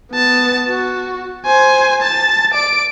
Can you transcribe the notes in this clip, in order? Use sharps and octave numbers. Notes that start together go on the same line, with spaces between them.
B3 A5
F#4
C5 G#5
A5 A6
D5 D7